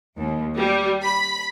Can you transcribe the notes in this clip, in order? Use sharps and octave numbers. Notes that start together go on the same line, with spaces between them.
D#2
G3
B5